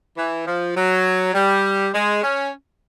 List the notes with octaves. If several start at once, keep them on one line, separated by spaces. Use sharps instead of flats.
E3
F3
F#3
G3
G#3
C#4